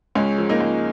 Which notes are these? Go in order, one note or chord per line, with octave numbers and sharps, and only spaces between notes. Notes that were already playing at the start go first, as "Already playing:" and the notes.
C#2 G#3 C#4
F3
A#3 D#4
C#2